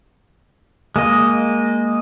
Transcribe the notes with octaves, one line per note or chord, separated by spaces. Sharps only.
G#3 A#3 D#5